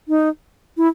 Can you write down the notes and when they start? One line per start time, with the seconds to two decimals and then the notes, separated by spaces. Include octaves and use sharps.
0.08 D#4
0.77 E4